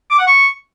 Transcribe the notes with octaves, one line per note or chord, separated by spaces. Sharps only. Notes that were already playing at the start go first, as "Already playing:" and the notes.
D6
F#5
C#6